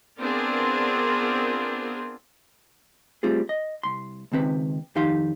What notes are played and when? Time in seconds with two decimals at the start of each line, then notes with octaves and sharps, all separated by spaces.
0.18 B3 C4 D4 F4 G#4 A#4
3.23 G3 A3 C4 F4 G#4
3.49 D#5
3.83 C2 C6
4.32 C#2 D#3 C4 B4
4.95 F2 D#3 D#4 G4 F5 C6